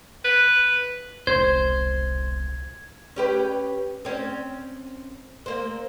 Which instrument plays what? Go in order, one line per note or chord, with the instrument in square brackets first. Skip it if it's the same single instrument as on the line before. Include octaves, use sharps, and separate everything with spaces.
[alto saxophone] B4
[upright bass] E1 C2 [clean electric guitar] C5 [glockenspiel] G#6
[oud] C#4 G4 B4
C4 C#4
A#3 C4